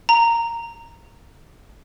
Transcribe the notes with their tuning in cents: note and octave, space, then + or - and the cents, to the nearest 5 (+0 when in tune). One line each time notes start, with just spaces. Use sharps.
A#5 -10